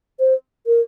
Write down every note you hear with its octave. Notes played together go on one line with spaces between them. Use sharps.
C5
A#4